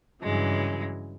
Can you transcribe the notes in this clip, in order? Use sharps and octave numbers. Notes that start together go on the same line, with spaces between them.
G2 C#3 E3 F#3 G#3